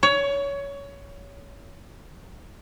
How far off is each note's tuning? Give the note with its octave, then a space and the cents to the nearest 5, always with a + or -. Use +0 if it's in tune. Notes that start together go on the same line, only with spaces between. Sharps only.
C#5 +20